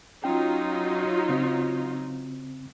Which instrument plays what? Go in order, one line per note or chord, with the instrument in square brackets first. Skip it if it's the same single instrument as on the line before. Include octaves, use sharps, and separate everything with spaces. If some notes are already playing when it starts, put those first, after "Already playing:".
[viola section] F#3 D#4 F4 [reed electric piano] C#4 G5
[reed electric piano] C#3 C4